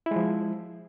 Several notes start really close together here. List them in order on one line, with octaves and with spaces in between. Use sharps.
E4 G#3 F3